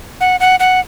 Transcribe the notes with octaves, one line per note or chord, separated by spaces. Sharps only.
F#5
F#5
F#5